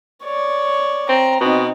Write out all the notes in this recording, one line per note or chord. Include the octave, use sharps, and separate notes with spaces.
C#5 D5
C4 A#5
B2 C4 D#4